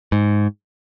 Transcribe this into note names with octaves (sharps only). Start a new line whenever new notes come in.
G#2